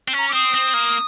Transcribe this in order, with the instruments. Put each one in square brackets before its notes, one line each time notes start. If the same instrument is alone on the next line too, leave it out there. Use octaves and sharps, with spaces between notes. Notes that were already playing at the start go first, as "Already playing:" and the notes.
[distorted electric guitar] C4
C#4
[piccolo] A#5
D6
[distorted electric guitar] C4 [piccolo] D#6
[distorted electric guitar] C4
A#3